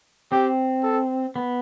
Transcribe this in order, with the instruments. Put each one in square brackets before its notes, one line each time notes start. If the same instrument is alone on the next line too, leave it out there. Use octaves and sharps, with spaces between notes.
[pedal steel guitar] C4 [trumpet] G4
[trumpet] A4
[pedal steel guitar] B3